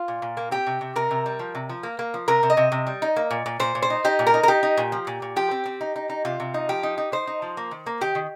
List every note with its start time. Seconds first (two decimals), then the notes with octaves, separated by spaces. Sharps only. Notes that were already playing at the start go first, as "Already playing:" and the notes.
Already playing: F4
0.08 A#2
0.22 A#2
0.37 A#3
0.51 C4 G4
0.67 C3
0.81 C3
0.96 C3 A#4
1.11 C3
1.26 G3
1.39 F3
1.55 C3
1.69 F3
1.83 A#3
1.99 A#3
2.14 F3
2.28 C3 A#4
2.43 C3
2.50 D#5
2.57 C3
2.72 C3
2.87 G3
3.02 D#4
3.16 A#3
3.31 A#2
3.46 A#2
3.60 A#2 C5
3.75 A#2
3.82 C5
3.90 D#4
4.04 D#4 G4
4.19 A#2
4.26 A#4
4.34 D#4
4.43 A#4
4.48 D#4 G4
4.63 D#4
4.77 A#2
4.92 F3
5.07 A#2
5.22 A#2
5.36 F3 G4
5.51 C4
5.65 C4
5.81 D#4
5.96 D#4
6.10 D#4
6.25 C3 F4
6.40 C3
6.54 D#4
6.69 F3 G4
6.83 D#4
6.98 D#4
7.12 D#4 C5
7.27 D#4
7.42 F3
7.57 A#3
7.71 D#3
7.86 A#3
8.01 D#3 G4
8.15 D#3